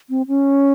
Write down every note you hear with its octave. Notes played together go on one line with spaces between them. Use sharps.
C4
C#4